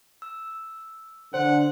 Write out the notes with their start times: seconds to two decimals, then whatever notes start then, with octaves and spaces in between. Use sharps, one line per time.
0.22 E6
1.34 D3 C5 F#5